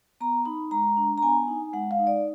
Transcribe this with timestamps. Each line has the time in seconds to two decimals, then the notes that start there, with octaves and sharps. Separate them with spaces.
0.21 B3 A#5
0.45 D#4 B5
0.71 G#3 A#5
0.97 D4
1.18 A#5
1.22 B3 G#5
1.48 D#4
1.73 G#3 F#5
1.91 F5
1.99 D#4
2.07 D5